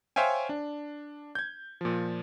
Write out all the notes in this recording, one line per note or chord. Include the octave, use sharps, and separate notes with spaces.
C5 C#5 E5 F5 G5 G#5
D4
G6 G#6
A#2 F3